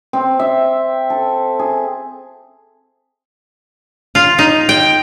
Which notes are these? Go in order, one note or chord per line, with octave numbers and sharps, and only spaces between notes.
C4
E5
A4
G#4
F4
D#4
G5